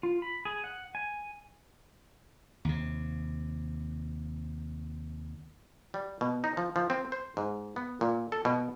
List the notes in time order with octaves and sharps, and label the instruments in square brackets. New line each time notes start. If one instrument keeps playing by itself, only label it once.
[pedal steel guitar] F4
B5
G#4
F#5
G#5
[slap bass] D#2 C3
[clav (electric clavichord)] G3
B2
D#4
F3
F3
C4
C5
G#2
B3
A#2
A4
B2